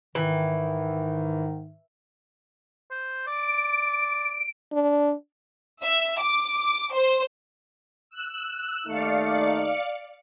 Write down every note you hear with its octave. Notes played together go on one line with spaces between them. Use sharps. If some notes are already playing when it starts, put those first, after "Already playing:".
G#2 D#3 E3
C5
D5 D7
D4
E5
D6
C5
E6 F#6
D#2 A3 D#4 D5 F5 C#7